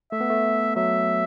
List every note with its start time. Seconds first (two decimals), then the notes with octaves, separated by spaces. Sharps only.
0.12 A3 E5
0.21 B3
0.30 A3
0.76 F#3 E5